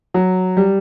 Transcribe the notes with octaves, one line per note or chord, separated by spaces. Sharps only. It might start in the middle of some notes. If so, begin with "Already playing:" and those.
F#3
G3